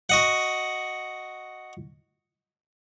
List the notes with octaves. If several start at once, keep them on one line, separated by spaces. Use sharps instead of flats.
F#4 D#5 F#5